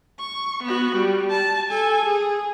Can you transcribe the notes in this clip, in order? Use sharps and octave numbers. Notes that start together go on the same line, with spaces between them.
C#6
B3 F#4
G3
A5
A4 G#5
G#4